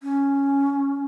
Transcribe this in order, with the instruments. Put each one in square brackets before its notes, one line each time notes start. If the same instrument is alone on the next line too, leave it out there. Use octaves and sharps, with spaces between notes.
[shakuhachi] C#4